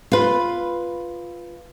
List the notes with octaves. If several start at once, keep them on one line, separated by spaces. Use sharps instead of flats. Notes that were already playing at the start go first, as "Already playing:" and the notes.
F4 B4